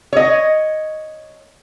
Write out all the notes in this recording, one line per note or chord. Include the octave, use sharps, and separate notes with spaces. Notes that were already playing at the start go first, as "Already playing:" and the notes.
C#5 D#5